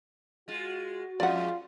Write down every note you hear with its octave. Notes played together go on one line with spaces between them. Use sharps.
G#3 F4 F#4
F2 G#3 F4 D5 F#5